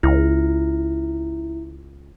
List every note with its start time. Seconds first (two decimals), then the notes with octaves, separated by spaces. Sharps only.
0.03 C#2 E4